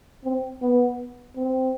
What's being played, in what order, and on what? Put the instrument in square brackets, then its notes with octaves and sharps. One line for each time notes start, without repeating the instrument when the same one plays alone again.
[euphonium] C4
B3
C4